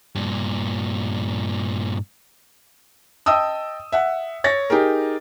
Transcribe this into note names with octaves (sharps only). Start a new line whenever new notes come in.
G2 A#2
D#5 G5 A5 D#6 E6
E5 F#5
C#5 A6 A#6
D#4 G4 G#4 A#4